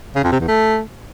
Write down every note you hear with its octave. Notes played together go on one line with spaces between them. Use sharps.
C#3
F2
C3
E2
A3